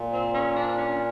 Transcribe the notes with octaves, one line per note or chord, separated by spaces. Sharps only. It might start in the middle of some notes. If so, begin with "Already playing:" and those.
Already playing: A#2
C4
C#4
D4
C#4